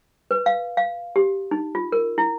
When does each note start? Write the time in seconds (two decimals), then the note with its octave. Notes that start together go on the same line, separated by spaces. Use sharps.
0.31 B4
0.46 F5
0.77 F5
1.16 G4
1.51 D#4
1.75 F4
1.92 A#4
2.18 E4